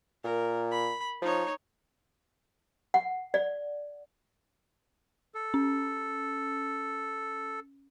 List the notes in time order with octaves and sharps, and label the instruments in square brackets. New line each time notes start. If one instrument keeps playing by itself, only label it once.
[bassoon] A#2 [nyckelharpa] A#4
[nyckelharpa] B5
[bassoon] F3 [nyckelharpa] D#4 C#5
[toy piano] F#5
D5
[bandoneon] A4
[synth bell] C#4